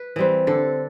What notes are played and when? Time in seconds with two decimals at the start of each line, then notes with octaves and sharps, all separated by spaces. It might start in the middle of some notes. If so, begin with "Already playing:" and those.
Already playing: B4
0.16 E3 G3 C4
0.47 D3 A4